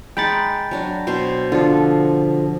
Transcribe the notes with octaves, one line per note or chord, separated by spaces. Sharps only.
G#3 D#4 F#5 G5 B5 A6
F#3 D4 F#4
B2 C5 C6
D3 F3 F4 A4